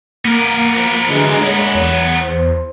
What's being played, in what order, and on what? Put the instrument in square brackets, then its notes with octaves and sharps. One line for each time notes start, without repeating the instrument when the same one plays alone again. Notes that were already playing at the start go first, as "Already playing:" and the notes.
[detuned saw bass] A#3 [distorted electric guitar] B3 A#4
[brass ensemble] F3
[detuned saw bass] D3 [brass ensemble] E3 F#3 G#3
[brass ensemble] A#2 D3 C#5 [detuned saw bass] G#3
[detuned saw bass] E2
[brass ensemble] C5